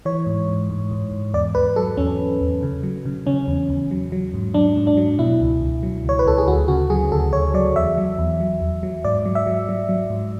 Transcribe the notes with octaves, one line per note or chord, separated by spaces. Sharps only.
E3 C#5
G#2
G#2
G#2
G#2
G#2
E2 D5
E2 B4
F#3 A4
E2 C#4
E2
E2
C#3
F#3
C#3
C#3 C#4
E2
E2
F#3
F#3
G#2
F#3 D4
G#2
D4
F#3
B2 E4
C#2
C#2
F#3
C#2 C#5
B4
C#2 A4
G#4
D2 F#4
C#3 F#4
F#3 G#4
D2 A4
D2 C#5
F#3 D5
E2 E5
F#3
E2
F#3
E2
F#3
G#2 D5
F#3
E5
F#3
F#3
F#3
G#2